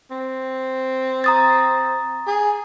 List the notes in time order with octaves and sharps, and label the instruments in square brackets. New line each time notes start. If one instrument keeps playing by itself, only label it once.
[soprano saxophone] C4
[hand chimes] A#5 D#6 A6
[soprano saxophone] G#4